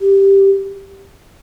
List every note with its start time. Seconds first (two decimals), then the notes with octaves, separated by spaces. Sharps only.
0.01 G4